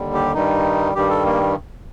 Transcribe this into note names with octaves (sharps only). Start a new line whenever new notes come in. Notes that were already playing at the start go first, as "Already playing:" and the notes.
Already playing: D#2 D3 G3
G4
G2 D#3 G3 D#4
G2 D#3 G3 G4
A4
A#3